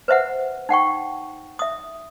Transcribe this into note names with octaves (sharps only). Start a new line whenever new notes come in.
B4 C5 E5 F#5
D#4 F#5 G5 C#6
E5 D#6